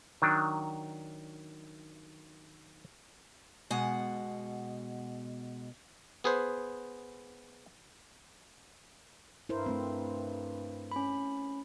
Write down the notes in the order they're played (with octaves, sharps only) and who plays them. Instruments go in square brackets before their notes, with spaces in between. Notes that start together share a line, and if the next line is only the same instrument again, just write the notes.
[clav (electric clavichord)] D#3 F#3 D4
[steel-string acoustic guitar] B2 G#3 F#5
[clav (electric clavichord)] B3 G#4 B4 C5
[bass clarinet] G2 [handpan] E4 A#4 C5
[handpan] A3 C4
[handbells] C#4 B5